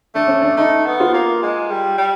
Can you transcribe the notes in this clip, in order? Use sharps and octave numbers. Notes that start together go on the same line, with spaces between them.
A3 D4
C#4
D4
A3 D#4
B3
F4
A#3
G#3
G3
G3